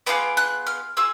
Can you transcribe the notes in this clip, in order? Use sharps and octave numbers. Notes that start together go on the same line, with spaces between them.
B3 D4 F4 G#4 D6
F#6
F6
F4 G#4 E6